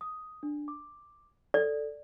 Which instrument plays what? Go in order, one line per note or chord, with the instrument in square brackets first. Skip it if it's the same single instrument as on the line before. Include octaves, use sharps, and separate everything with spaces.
[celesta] D#6
D4
D6
[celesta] A4 [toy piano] D5